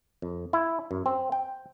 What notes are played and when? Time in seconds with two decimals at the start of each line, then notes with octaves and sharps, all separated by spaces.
0.22 F2
0.53 E4
0.91 F#2
1.06 C4
1.32 G5